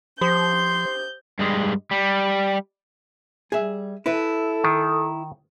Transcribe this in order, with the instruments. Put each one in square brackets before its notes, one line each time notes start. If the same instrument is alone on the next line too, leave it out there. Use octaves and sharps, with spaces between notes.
[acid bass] F3 [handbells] G4 C5 D#6 [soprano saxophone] C6 [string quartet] G6
[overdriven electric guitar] G2 G#3
G3
[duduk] G3 [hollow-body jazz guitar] G#4 E5
[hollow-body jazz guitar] E4 B4 [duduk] A4
[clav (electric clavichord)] D#3